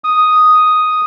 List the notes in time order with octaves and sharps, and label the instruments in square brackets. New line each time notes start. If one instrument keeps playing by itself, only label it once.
[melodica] D#6